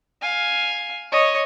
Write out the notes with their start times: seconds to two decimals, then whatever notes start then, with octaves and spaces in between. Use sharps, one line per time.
0.22 F5 G#5
1.12 C#5 D#5